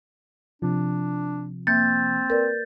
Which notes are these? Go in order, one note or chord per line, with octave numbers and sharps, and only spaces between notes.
C3 F3 D4
A#3 C4 E5 G6 A6
A#4 B4 D5